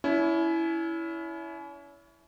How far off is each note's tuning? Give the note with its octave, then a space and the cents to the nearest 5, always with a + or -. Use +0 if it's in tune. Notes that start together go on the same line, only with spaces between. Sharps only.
C#4 +35 E4 +0